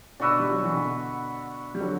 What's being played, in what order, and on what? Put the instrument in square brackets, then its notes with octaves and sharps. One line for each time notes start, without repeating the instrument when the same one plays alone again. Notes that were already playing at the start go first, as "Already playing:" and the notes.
[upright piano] B2 D3 [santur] D4 F#4 B4 E5
[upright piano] G3
F#3
E3
B2 D3
G3
D3 F#3